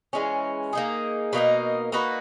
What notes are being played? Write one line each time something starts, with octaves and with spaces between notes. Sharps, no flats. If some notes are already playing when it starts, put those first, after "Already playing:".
E3 G#3 C#4
A#3 D#4 G#4
B2 A#3 D#4 A#4
A#3 D#4 F#4 B4